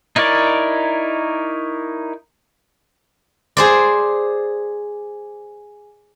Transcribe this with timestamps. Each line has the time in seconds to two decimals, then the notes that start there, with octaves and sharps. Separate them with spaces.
0.16 D#4 E4 A#4 C#5 D5
3.57 G#4 C5 D5